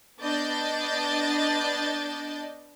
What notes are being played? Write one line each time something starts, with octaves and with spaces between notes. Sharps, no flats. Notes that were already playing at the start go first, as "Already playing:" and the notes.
B3 D4 D5 D#5 G6 A6